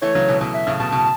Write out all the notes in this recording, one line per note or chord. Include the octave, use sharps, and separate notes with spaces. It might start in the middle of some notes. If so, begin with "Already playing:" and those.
E3 A3 C#5
C#3 F#3
B2 E3
B2 E3
E5
A2 C#3
B2 A5
B2